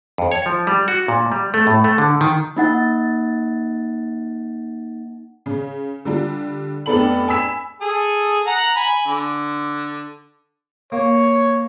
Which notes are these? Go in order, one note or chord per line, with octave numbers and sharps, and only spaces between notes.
F2
C#5
F3
G3
F#4
A#2
G3
A3
A2
A3
D3
D#3
A#3 D#4 F#5 A6
C#3
D3 G3 F4
F1 B3 D4 A4 B5 F#7
G#5 B5 E6 B6 E7
G#4 A4
F#5 A#5
G#5 B5
D3
A#3 C#5